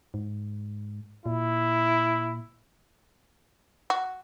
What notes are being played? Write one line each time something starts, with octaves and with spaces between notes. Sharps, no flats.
G#2
A#2 E4
F#4